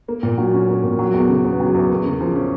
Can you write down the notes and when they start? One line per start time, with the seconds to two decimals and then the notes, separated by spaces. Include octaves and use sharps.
0.08 A#3
0.23 A#2
0.38 F#3
0.53 C#4
0.69 A#3
0.84 A#2
0.99 F#3
1.14 E2
1.29 C#3
1.45 B3
1.60 F#3
1.74 E2
1.90 A#3
2.05 C#3
2.21 F3
2.35 C#4